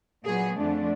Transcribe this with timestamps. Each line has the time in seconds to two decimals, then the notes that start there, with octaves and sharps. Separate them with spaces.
0.25 A#2 F#3 B3 G#4
0.56 F2 D3 F3 A3 D4